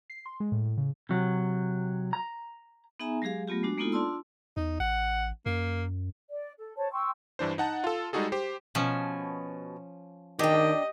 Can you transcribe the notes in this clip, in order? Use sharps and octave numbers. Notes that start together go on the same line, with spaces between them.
C7
C6
G#3
A2
A2
C#3
C3 F#3
A#5
B3 D#4 G#4 E5 G#5 A#5
F#3 G#3 G4 G#4 F5
F#3 A3 B3 F4 G4
G#3 D4 F#4
G#3 A#3 B3 D#4 F4 A4
D4 F4 D5 A5 C6 E6
E2 D#4
A1 F#5
F#2 A#3
D5
A4
C5 C#5 A5
G5 C6 C#6 E6
G2 E3 D4 C5
D#4 F#5 A5
F4 A4
G3 G#3 D#4 F#4 G#4 A4
G4 C5
B2 F3 C#4
D#3 D4 G4 D#5 G5